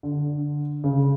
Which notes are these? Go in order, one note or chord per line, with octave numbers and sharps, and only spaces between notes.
D3
C#3